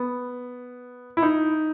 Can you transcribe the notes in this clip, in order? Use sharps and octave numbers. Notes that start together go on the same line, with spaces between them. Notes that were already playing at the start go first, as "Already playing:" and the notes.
Already playing: B3
E4
D#4